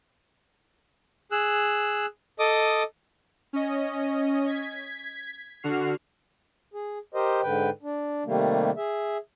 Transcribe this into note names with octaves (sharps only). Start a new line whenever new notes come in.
G#4 E6 F#6
A4 D#5 D6 D#6
C#4 D#5
G#6 B6
D3 F#4 F6 C7
G#4
G4 A#4 C5 D#5
G#2 D3 B4 G5
D4
C3 D#3 G3 A3 A#3
G#4 E5